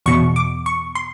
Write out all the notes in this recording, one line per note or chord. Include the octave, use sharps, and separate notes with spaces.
E2 B2 C#6
D6
C#6
C6